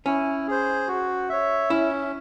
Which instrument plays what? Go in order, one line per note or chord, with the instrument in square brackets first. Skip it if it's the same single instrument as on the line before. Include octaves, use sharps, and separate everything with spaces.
[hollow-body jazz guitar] C#4 [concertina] E4
[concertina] G#4 C5
F#4
C#5 E5
[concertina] C#4 [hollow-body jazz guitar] E4